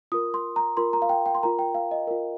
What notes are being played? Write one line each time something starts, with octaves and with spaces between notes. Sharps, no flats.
F4 A#4 D#6
C6
A#5
F4 A#4 C6
A#5
F5
G5
G5
C6
F4 A#4 A#5
G5
F5
D#5
F4 A#4